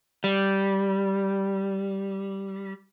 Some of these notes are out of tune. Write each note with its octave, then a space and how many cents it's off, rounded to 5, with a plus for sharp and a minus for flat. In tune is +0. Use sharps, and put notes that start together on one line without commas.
G3 -5